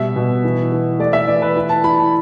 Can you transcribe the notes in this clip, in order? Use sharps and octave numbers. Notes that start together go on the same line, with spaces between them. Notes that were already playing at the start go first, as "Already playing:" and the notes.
Already playing: B2 G3 E5
B2
E3
E3
A3 D5
E5
E3 D5
B4
E4
A5
E4 B5
A5